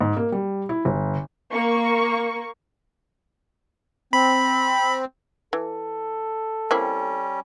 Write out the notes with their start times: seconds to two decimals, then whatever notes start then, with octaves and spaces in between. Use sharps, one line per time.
0.01 G#2
0.17 A#3
0.32 G3
0.69 E4
0.85 G1
1.51 A#3 C#6
4.13 C4 B5
5.53 E3 A4
6.71 G3 A#3 C4 C#4 E4